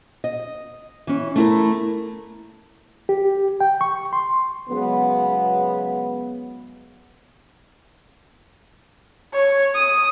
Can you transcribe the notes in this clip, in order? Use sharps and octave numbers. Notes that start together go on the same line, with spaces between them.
D#5
E3 C#4
A3 E4 A#4
G4
G5
C#6
C6
C#3 F#3 G#3 B3
C#5
D#6